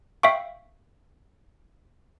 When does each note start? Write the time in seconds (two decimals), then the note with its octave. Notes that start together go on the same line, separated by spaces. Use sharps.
0.23 E5 F5 G5 C#6